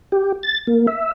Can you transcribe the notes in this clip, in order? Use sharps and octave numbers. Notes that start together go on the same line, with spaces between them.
G4
A6
A#3
E5